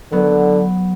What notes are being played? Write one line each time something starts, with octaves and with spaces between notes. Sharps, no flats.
D3 F#3 B3